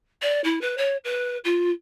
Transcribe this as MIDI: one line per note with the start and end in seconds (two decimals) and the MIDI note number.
0.22 0.40 74
0.44 0.59 64
0.61 0.75 71
0.77 0.96 73
1.04 1.37 71
1.44 1.70 65